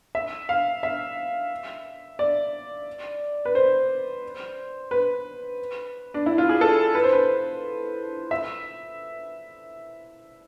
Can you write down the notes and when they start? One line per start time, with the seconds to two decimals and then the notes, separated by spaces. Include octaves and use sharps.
0.15 E5
0.49 F5
0.83 E5
2.19 D5
3.45 B4
3.55 C5
4.91 B4
6.14 D4
6.26 E4
6.38 F4
6.49 G#4
6.61 A4
6.95 B4
7.04 C5
7.13 B4
8.31 E5